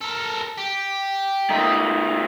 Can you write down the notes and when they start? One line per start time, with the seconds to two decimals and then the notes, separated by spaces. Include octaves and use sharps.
0.01 A4 A#4
0.58 G4
1.50 B2 A3 D#4